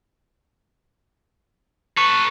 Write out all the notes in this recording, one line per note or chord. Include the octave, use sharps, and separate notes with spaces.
A4 B4 C#6